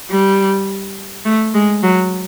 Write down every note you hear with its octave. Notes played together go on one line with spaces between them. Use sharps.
G3
A3
G#3
F#3